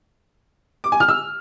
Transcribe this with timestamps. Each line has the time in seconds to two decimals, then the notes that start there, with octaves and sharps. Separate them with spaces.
0.84 D6
0.92 G#5
1.00 F6
1.08 E6